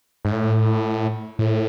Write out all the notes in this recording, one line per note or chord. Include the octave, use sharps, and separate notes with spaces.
G#2
A2
A2